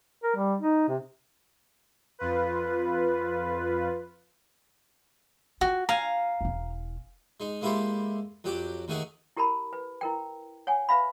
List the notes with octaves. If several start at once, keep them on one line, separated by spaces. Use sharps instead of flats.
A#4
G3
D#4
C3
F2 F4 B4
F4 F#4
F5 G#5 A#5
E1 E4
G#3 D#4
G#3 A#3 E4 G4 A4 C5
F2 F#3 G4 G5 D6
D#2 D#3 A3 D#4 G#4 F#5
E4 G4 A#4 A5 B5
B4
E4 A#4 G5
C#5 F#5 G#5
B4 E5 F5 B5